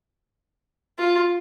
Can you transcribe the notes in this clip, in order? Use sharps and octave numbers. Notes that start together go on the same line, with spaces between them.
F4